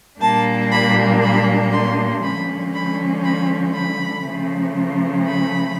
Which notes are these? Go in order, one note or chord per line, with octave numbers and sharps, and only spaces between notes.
A#2 G3 A#3 D4 A5
B5
B5
C6
D3 F3 G#3 C#4 B5
B5
B5
B5
C#3 F3 A3
B5